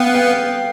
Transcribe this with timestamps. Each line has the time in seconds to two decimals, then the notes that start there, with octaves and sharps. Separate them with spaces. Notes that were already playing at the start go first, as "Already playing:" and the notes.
Already playing: B3 F5 G5
0.14 F5 G5